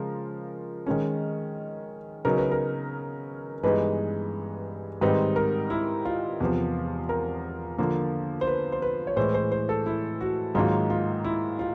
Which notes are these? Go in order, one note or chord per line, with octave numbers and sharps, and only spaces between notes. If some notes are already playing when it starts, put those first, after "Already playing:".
Already playing: C#3 F3 G#3 A#4
D#3 G#3 C#4
C#3 F#3 B3 D#4 A#4
B4
A#4
G2 E3 G#3 B3 D#4 B4
G#2 D#3 G3 C4 D#4 B4
A#4
E4
F4
E2 C3 F3
A#4
D3 F3 A#3
C5
B4
C5
B4
C#5
A2 E3 G#3 C5
C5
C5
A4
E4
F#4
G#2 D#3 F#3 A#3 D#4 F4
F4
E4
F4